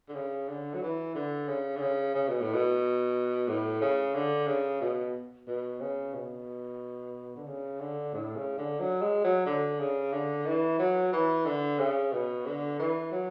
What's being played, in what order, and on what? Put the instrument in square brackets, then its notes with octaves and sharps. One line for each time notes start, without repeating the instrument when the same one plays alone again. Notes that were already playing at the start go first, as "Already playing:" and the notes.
[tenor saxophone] D3
C#3
D3
F#3
E3
D3
C#3
D3
C#3
C#3
B2
A2
B2
A2
C#3
D3
C#3
B2
B2
C#3
B2
D3
C#3
D3
A2
C#3
D3
F#3
G#3
F#3
D3
C#3
D3
E3
F#3
E3
D3
C#3
B2
D3
E3
F#3